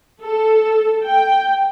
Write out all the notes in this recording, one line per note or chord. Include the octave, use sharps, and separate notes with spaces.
A4
G5